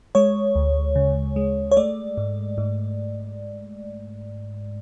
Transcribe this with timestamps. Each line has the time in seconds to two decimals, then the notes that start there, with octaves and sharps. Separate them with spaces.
0.15 G#3 C#5
0.55 D2
0.96 C#3
1.36 G#3
1.71 C#5
1.77 A3 D5
2.17 G#2
2.58 G#2